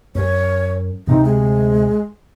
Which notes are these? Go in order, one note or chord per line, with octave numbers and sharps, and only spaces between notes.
F#2 C#5
D2 C3 C4 D#4
G#3